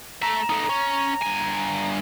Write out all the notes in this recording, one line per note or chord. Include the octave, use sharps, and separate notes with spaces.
A3 E5 A#5
D#4 A4
C#4
G2 G#5